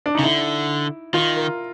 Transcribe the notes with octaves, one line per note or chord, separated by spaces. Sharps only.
D4
C#3 D#4
D3 E4
D#3 F4
A#4